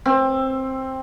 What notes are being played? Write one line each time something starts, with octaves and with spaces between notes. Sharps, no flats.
C4